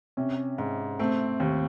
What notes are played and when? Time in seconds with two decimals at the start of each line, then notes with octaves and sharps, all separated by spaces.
0.17 C3 C#4
0.58 G#2
0.99 A3 C4
1.40 D#2